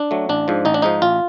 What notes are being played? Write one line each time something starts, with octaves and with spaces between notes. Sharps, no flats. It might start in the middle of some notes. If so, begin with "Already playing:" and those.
Already playing: D4
F#3 A3
A1 D4
G#2 F3
A1 D#4
D4
G#2 F3 D#4
A1 F4